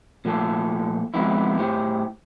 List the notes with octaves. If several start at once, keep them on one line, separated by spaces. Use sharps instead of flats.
A#2 F3 A3 A4
F3 G#3 B3 C4 D#4 E4
A2 G4 C5